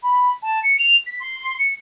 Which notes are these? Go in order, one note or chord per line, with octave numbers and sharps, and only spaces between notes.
B5
A5
C#7
F7
B6
C6
C#7